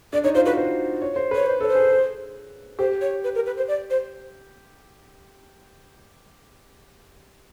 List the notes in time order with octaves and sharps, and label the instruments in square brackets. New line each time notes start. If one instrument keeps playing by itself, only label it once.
[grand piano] D4 [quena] D5
[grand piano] D#4 [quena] C#5
[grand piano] F4 [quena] C5
[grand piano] F#4 [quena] B4
[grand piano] C5
C#5
C5
[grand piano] B4 [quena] C#5
[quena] C5
[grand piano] A4 [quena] C#5
[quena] C5
[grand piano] G#4
G#4
[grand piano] G4 [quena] C5
[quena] C#5
B4
A#4
B4
C5
D5
C5